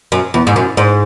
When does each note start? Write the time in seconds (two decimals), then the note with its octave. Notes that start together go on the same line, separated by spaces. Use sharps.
0.12 F#2
0.34 E2
0.47 G#2
0.56 F#2
0.77 G#2